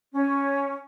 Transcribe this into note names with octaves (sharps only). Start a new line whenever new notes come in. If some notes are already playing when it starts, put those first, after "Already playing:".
C#4